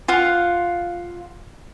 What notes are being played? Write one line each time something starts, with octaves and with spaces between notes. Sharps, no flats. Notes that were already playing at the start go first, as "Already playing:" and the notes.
F4 F5 F#5